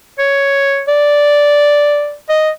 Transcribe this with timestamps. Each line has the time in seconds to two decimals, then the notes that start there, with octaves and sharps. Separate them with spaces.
0.19 C#5
0.88 D5
2.29 D#5